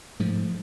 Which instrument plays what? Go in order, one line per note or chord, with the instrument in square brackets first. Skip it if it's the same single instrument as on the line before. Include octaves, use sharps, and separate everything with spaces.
[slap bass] G#2 F3 A3